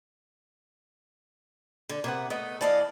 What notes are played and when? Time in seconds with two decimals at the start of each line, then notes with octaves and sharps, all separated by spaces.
1.89 D3
2.04 C3 A#3 B3 F#5
2.30 A3 B3 D#5
2.61 E3 F3 A4 D5 D#5 F5